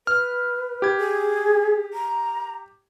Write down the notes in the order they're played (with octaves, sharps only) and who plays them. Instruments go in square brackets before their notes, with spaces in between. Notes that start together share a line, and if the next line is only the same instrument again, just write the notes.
[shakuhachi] B4 [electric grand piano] F6
[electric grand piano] G4 G#6
[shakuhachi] G#4
A#5